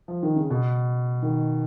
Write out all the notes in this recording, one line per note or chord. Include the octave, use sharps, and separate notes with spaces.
F3
D#3
C#3
B2
D#3